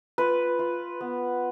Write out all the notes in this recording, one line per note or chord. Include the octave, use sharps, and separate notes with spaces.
F4 B4
F4
B3